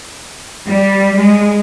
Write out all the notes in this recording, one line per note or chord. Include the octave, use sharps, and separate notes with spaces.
G3
G#3